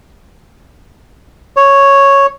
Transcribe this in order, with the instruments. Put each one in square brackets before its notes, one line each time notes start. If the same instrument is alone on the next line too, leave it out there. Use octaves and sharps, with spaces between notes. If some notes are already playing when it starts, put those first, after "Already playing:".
[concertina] C#5